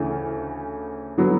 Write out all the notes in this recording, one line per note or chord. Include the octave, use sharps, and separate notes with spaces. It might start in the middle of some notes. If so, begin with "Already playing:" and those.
Already playing: D2 C#3 E3 A3 C#4
D3 F#3 B3